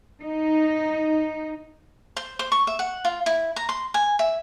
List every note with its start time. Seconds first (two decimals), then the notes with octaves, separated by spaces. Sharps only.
0.22 D#4
2.17 C5
2.39 C5
2.52 C#6
2.67 E5
2.79 F#5
3.05 F4
3.26 E4
3.56 A#5
3.69 C6
3.94 G#5
4.19 E5